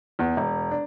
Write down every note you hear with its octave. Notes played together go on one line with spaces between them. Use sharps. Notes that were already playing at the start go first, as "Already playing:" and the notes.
E2
E1
D4